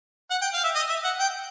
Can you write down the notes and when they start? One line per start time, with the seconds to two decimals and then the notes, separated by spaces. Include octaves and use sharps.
0.30 F#5
0.42 G5
0.54 F5
0.64 E5
0.75 D#5
0.89 E5
1.04 F#5
1.19 G5